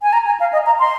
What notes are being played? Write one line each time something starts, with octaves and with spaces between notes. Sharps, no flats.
G#5
A#5
G#5
F5
D#5
A#5
C6